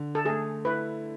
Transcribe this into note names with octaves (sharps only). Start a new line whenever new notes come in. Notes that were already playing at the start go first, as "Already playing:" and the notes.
Already playing: D3
A4
A3 G#4
E4 B4